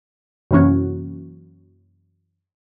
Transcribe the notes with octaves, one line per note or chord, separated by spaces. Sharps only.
F#2 C3 E3 A#3 C#4 F#4